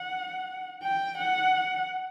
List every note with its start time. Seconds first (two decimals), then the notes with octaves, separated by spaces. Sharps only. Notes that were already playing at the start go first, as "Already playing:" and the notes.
Already playing: F#5
0.83 G5
1.19 F#5